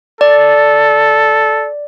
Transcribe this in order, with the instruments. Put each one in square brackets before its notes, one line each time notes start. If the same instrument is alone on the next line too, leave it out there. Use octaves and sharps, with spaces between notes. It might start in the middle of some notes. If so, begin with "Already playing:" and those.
[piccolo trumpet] A4 [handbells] D5